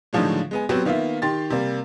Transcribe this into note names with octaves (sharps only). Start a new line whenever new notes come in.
A2 D3 D#3 F3 F#3 G#3
G#3 B3 G#5
F#3 B3 C4 F#4 G4
D#3 A#3 B3 F4 E5
D#3 G4 C6 A6
C3 G3 A#3